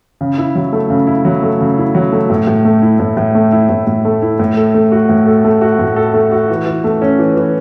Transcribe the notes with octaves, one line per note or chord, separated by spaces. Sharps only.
C#3
E4
F#3
A3
C#3
E4
F#3
A3
C#3
E4
F#3
A3
A2
A2
A3
E4
A2
A2
A3
E4
A2
A2
A3
E4
A2
A4
A3
F#4
A2
A4
A3
F#4
A2
A4
A3
F#4
E3
E3
A3
C#4
E3
E3